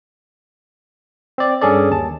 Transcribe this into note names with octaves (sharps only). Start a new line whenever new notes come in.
C4 D5
G2 C#4 G#4 A4 D5
D#2 A5